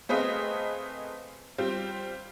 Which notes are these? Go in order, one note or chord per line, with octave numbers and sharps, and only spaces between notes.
A3 C4 G#4 B4 D#5 F5
G3 C4 F4 G4